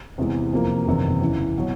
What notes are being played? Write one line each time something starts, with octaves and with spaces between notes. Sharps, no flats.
E2 C3 E3 G#3 B3
F2 C3 F3 A#3
F#1 E2 C3 D#3
E2 C#3 E3
B2 F#3